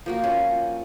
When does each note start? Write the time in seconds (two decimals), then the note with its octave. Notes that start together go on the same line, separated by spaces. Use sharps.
0.06 F3 A#3 F#4
0.24 C#4